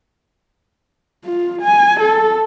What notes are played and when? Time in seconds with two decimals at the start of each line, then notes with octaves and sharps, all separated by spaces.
1.25 F4
1.62 G#5
2.00 A4